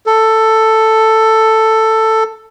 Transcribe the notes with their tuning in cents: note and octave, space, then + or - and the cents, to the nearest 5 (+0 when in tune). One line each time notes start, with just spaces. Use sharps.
A4 +10